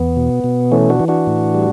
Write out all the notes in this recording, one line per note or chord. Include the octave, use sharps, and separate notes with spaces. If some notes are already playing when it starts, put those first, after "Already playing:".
Already playing: E2 B3
B2
B2
E3 A3 C#4
D4 F#4
E3
D4 F#4
A2
G3